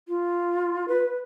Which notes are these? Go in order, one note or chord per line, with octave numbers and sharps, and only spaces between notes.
F4
B4